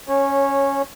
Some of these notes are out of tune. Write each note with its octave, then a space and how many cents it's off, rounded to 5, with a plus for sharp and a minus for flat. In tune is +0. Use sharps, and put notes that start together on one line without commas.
C#4 +0 C#5 -15